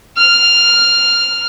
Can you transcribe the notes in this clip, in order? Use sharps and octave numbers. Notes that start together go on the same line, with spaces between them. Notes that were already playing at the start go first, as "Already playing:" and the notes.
F6